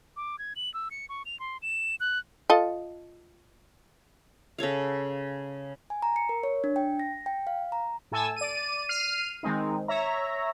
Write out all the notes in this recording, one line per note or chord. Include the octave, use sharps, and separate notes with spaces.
D6
G#6
F#7
E6
C#7
C#6
F7
C6
E7
F#6
F4 A4 D#5
C#3 A4 C#5 F5
G#5
A#5
C#7
A#4
C#5
D4
G5
A#6
G5
F5
A#5
A2 A4 G#5 A5 E6
D5 D#7
F6 C7 D#7
D#3 G#3 C4 D#4
C#5 E5 A#5